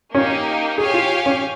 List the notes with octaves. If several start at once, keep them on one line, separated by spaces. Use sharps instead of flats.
A#3 C#4 D#4 G4
G4 G#4 C#5 F5 G#5
F4
C#4